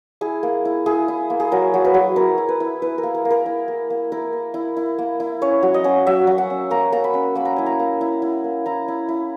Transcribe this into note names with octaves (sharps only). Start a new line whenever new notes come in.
E4 G#4
A#3
E4
E4 G#4
E4
A#3
G#4
F#3 A#4
F#3
B4
F#3
E4 A#4
E4
B4
E4
E4 B4
A#4
A#3
A#4
A#3
A#4
E4
A#3
A#3
E4 A#4
A#3
E4
E4
A#3
E4
C#4 C#5
F#3
D#5
C#4
F#3 E5
F#3
F#5
C#4
A#3 A#5
A#3 A#5
B5
C#4
A#3 B5
A#5
E4 G#5
A#5
A#3
E4
E4
A#3
E4 A#5
E4
E4